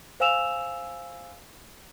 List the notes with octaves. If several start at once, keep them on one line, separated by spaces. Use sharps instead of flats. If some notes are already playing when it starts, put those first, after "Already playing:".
C5 F5 G#5 E6 E7 F7